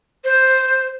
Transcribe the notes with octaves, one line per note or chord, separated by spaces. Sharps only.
C5